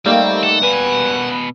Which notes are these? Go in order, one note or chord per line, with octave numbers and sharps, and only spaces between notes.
G3 A3 A#3 C4 D#4
A4 F#5
B2 B4 G#5